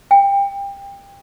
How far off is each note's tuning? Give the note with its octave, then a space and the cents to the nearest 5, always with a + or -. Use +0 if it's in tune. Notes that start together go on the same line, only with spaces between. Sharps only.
G5 +25